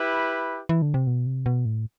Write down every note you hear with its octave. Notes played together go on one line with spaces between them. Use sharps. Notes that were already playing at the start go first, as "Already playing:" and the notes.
Already playing: E4 G4 B4
E3
D3
C3
B2
C3
B2
A2